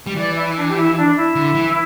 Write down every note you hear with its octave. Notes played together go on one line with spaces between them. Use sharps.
G3
E3 D5
E4
D4
G4
E4
D4
E4
D3
E3